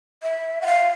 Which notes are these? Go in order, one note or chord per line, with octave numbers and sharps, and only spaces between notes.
E5
F#5
F5